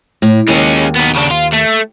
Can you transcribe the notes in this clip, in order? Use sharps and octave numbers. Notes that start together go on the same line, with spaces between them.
A2
D#2 G#3 C#4
B3 D#4
C#3 D4
F4
A3